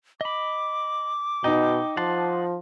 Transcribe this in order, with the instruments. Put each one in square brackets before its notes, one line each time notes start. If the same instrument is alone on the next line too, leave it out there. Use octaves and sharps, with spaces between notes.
[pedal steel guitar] D#5 B5 [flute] D6
[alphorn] B2 [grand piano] D#4 [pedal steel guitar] G5
[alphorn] F3 [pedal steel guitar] F#5 A5 C6